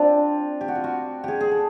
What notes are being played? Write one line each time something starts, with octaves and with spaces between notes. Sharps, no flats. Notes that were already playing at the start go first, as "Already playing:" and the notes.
Already playing: C4 D4 F4
G4
F#4
F4
F#4
G4 G#4
G#4
A4